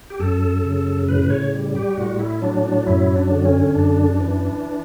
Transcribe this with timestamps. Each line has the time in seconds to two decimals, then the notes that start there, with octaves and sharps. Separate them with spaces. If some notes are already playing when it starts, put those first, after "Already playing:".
0.10 G4
0.19 F#2 A4
0.64 C#3
1.08 A2 B4
1.23 B4
1.30 C#5
1.54 G3
1.75 G4
1.97 A2 F#4
2.20 E4
2.42 F#3 D4
2.65 D4
2.87 F#2 E4
3.16 D4
3.31 D3
3.45 C#4
3.75 F#2 D4
4.21 E3